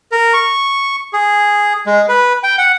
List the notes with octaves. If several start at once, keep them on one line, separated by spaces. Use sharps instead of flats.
A#4
C#6
G#4
G#3
B4
G5
F#5